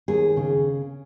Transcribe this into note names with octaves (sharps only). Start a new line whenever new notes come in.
D#2 G#4
C#3